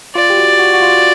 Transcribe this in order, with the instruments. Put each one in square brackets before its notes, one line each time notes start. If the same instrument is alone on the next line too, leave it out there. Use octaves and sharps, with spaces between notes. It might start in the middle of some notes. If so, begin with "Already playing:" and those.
[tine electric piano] F4 [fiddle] D5
[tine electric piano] G4
F#4
F#4
F#4
F4